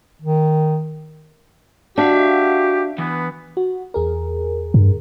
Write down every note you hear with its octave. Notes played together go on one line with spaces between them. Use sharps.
D#3
D4 F#4 G4 E5 F5
E3 B3
F#4
E2 G#4 A#4
G2